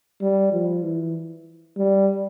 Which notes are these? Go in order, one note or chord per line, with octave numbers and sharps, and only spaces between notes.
G3
F3
E3
G3